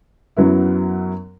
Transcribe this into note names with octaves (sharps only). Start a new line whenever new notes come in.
F#2 F#3 B3 E4